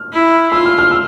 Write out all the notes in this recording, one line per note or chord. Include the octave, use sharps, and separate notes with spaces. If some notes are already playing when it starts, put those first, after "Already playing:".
Already playing: F6
E4
F4 E6
F6
F6
E6